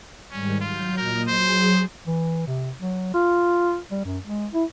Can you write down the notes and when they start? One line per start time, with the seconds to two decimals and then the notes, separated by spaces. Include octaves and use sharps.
0.31 G#2 D#3 G3 C#4
0.61 F#3 F4 G6
0.97 A#2 A#4 D#5
1.28 F#3 G#4 C5
2.07 E3
2.48 C3
2.79 F#3
3.14 F4
3.91 G3
4.05 F#2
4.25 G#3
4.53 E4